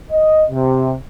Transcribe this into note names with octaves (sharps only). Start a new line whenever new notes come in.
D#5
C3